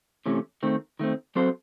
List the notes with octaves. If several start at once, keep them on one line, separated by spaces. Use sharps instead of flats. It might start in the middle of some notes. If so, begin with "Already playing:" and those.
C3 E3 A3 C#4
D#3 A3 C4
D#3 A3 C4
F#3 C4 F#4 A4 C5